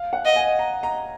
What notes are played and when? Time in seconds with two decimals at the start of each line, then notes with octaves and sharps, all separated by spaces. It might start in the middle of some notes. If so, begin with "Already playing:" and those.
Already playing: F5
0.13 F#5
0.25 D#5
0.36 G#5
0.59 A#5
0.83 A#5